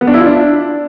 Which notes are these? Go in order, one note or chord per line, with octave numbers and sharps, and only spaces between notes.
B3
D4
E4
F4
D4